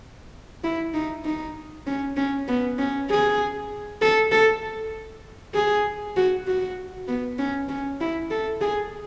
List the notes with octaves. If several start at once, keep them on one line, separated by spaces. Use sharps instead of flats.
E4
D#4
D#4
C#4
C#4
B3
C#4
G#4
A4
A4
G#4
F#4
F#4
B3
C#4
C#4
E4
A4
G#4